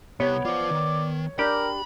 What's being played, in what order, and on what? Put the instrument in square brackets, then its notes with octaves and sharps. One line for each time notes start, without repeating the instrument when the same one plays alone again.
[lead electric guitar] C2 G4 [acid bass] B3 [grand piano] C#5
[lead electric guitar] F4 C5 [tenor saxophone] D5
[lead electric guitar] D#3
[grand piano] D4 [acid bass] G4 [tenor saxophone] A#4 [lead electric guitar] B5